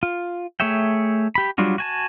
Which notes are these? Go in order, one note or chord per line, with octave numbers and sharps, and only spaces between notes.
F4
A3 G#4 C#5 E5 G5
G4 B5
F#3 G3 D4 F4 F#4
F#4 G#5 A5